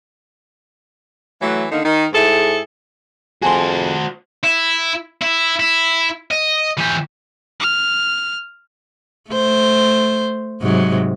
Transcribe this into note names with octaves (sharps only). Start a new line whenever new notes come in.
E3 F#3 A3
D3 D#3 A#3 D#4
D#3 D#4
G#2 E4 G#4 A4
F2 F#4 G#4 C5 A5 C6
E4
E4
E4
D#5
E3 G4
F6
A3 C5
G#2 C3 F#3